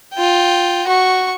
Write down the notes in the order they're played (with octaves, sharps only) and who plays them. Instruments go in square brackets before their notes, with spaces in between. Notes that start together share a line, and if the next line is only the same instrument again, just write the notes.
[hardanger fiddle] F4 G5
F#4 C#6